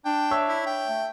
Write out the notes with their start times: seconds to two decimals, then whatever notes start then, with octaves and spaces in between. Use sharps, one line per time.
0.05 D4 G5
0.31 C#5 E5 E6
0.48 E4
0.67 G5
0.87 A3